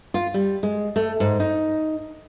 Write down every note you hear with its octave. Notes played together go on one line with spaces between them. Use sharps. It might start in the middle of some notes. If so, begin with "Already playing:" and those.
F4
G3
G#3
A3
G#2
D#4